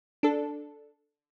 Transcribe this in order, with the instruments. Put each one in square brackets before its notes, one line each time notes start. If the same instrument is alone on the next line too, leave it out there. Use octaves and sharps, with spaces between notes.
[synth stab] D4 A4